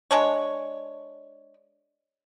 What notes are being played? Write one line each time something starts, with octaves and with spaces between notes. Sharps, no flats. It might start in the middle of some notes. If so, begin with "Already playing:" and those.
G#3 D4 C#5